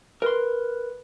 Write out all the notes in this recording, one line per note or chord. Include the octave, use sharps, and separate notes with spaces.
A#4 B4 C6